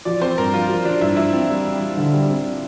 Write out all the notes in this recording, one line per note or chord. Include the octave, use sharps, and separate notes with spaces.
F3 D5
C4 C5
G2 A#4
F3 F4
F3
F3 D4
G2 E4
F3 E4
C4
G3
G3
G3
D3
G3
C4